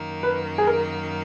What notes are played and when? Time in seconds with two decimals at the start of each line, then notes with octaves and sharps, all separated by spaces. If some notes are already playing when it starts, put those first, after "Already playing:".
Already playing: F#2 D#3 A#3
0.23 B4
0.58 G#4
0.67 A#4